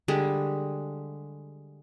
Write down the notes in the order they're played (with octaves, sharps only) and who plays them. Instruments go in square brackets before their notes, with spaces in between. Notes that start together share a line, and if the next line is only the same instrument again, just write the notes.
[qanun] D3 G3 G#3